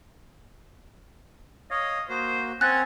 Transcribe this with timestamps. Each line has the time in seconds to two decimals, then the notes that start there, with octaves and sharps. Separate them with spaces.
1.71 C#5 D#5 F5
2.09 A#3 F#4 C5
2.61 C4 C#4 F#5 G#5 F#6 A6